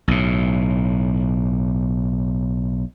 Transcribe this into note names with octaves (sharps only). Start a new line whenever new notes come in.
B1 A2